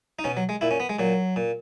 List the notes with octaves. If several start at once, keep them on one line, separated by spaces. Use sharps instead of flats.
D#4
B2 C#4
F#3
G#3
A#2 E4
C#4
B3
G#3
A#2 F#3
A#2